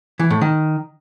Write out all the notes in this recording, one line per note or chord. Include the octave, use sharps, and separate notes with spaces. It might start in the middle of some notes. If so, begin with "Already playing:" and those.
E3
A2
D#3